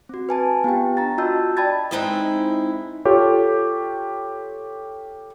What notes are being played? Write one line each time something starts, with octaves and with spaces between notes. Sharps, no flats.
C4 F#4
B4 G#5 A5
B3 F4 G4 G5
D4 A#5 A6
F4 F#4 D#5 A5 E6 G6
D5 G5 A5 B5 G#6 A6
G#3 C4 D#4 E4 C5 D#5
F4 G4 A4 C#5